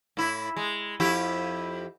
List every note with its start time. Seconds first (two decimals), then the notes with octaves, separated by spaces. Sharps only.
0.17 A2 E4
0.57 G#3
1.00 F2 E4 G4